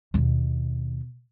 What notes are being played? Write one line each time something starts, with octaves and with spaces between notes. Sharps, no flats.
D#2 B2